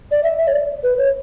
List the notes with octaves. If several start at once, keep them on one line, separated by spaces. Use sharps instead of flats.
D5
E5
E5
C#5
D5
B4
C#5